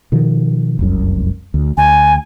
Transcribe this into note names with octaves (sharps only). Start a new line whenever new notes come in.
B2 D#3 F3
F1 C2 F#2
D2
D2 G#5